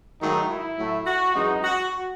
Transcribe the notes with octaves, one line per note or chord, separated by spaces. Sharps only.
G#2 D#3 F#3 A3 D#4
E4
A2 F#3 A3
F#4
F#2 E3 G#3 D#4
F#4